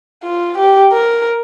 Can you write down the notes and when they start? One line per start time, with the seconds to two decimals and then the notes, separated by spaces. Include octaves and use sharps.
0.23 F4
0.58 G4
0.93 A#4